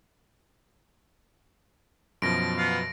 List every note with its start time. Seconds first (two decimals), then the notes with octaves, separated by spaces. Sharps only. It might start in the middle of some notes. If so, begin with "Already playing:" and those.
2.22 F#2 B2 F3 A#6 D7
2.57 B3 F5